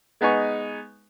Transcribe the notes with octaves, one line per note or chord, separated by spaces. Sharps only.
G#3 B3 D#4 G#5 C#6